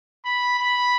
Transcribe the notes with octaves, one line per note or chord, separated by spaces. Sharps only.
B5
B5